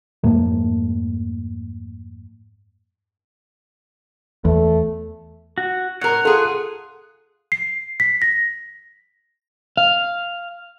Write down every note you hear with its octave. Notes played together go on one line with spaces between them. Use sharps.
F2 G#2 A3 A#3
E2 A3
F#4
A2 A#4 F#5
F4 G#4 A4
C7
B6
A#6
F5